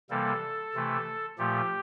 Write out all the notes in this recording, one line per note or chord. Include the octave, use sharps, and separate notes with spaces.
C3 E3 G3 A#3 A4
C3 E3 A3
A#2 F3 A3 G4